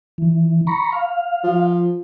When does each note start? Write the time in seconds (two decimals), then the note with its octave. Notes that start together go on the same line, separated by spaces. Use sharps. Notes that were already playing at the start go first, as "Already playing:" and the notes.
0.18 E3
0.67 A#5 B5 C#6
0.92 F5
1.44 F3